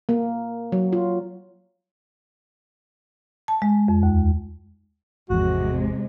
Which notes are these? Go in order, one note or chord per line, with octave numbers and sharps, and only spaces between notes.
A#3
F#3
F4
A5
G#3
F2
D#2
G#1 E2 C3 F3 G#3 F#4